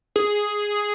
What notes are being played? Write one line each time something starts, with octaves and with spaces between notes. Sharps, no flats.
G#4